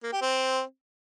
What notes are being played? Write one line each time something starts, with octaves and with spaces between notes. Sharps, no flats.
A#3
G4
C4